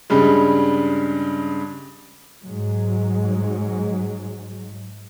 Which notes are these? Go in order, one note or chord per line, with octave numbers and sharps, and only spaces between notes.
G2 C#3 G3 G#3
G#2 F#3 G#3